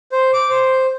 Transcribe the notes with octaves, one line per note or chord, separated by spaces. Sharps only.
C5
D6
C5